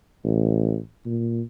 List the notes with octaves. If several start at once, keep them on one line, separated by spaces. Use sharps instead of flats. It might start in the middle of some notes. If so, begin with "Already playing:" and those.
A1
A#2